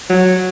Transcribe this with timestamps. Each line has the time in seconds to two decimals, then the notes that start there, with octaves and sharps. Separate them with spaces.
0.10 F#3